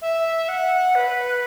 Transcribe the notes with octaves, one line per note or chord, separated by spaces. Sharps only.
E5
F#5
B4